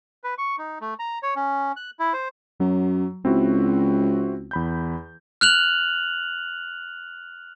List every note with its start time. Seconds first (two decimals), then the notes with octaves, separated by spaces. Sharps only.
0.24 B4
0.38 C#6
0.58 D#4
0.81 A3
0.99 A#5
1.23 C#5
1.36 C#4
1.76 F#6
1.99 E4
2.13 C5
2.60 F#2 F#3
3.25 C#2 C4 E4 F#4
4.51 E2 B5 G6
5.41 F6 F#6 F7 F#7